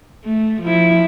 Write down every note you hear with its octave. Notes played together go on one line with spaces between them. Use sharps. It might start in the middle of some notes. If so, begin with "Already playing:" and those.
A3
F3 E4